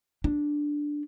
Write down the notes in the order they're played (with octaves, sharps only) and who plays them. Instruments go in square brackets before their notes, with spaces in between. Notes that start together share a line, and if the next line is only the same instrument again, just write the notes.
[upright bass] D4